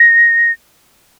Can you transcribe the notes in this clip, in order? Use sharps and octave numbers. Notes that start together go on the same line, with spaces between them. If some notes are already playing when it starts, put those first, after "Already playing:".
Already playing: A#6